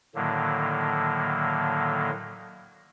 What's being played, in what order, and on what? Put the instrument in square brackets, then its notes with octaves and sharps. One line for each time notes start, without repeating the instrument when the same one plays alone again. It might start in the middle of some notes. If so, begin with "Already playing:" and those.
[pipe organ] A2 D3 D#3 F#3 A#3